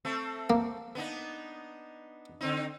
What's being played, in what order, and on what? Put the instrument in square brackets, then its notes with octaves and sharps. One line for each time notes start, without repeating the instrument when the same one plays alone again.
[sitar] A3 C4 A4
[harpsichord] A#3
[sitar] B3 D4 D#4
D3 C4 D#4